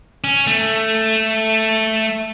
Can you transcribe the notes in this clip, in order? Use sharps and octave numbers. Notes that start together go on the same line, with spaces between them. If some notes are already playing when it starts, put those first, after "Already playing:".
C#4
A3